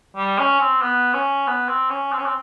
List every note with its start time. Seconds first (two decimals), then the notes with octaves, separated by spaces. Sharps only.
0.17 G3
0.39 C#4
0.60 C4
0.82 B3
1.14 C#4
1.47 B3
1.69 C4
1.90 C#4
2.12 C4
2.18 C#4
2.26 C4